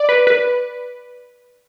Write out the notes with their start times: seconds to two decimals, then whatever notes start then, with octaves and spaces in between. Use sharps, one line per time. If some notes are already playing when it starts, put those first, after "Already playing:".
Already playing: D5
0.09 B4
0.27 B4